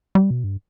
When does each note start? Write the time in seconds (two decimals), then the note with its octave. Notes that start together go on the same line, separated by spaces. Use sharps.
0.15 G3
0.31 B2
0.44 G2